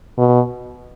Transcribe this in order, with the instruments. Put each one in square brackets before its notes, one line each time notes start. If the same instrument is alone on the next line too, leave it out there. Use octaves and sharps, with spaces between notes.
[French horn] B2